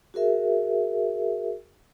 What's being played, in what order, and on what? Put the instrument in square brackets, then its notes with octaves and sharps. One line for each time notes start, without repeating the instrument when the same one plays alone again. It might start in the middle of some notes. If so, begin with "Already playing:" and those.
[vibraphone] F#4 G#4 A#4 E5